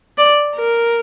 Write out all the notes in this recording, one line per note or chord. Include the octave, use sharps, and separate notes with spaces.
D5
A#4